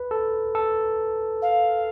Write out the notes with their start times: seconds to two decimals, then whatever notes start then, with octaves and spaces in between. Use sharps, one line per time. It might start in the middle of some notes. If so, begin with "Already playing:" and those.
Already playing: B4
0.11 A4
0.55 A4
1.42 F5